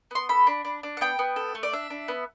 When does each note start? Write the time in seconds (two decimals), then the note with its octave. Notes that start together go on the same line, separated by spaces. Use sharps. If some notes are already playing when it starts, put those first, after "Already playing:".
0.11 B3 C6
0.29 A4 B5
0.47 D4
0.65 D4
0.83 D4
0.97 F#5
1.01 B3 G5
1.19 B3
1.36 A4
1.55 A3
1.63 D5
1.73 D4 E5
1.90 D4
2.08 B3